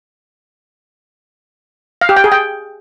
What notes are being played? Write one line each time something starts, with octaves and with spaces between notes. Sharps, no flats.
F5
G4
G5
G#4
G5